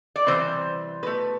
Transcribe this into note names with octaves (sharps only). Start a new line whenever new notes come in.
D5
C3 E3 G3 C5
B2 A3 B4